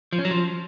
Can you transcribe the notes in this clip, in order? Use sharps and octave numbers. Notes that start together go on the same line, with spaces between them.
F3
C#4
F#3
F3